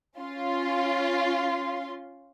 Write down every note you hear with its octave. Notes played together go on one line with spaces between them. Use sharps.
C#4 F4 C6